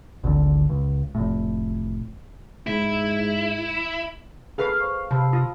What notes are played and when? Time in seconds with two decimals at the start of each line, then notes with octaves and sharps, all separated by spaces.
0.24 G#1 D2 D3
0.69 C#2
1.15 F1 A2
2.67 G#2 E4
4.58 G#4 A4 B4 F5
4.80 C5 C#6
5.11 C3 C5 A5 B5 E6
5.33 F4 D#6